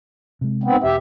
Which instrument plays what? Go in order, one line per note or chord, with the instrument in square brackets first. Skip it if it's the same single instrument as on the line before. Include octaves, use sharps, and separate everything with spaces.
[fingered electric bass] C3 G#3
[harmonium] G#2 B3 C4
[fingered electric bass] E1 [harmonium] G4 E5